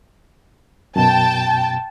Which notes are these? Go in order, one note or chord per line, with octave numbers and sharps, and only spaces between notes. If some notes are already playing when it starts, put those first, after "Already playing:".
F#2 B2 G5 A5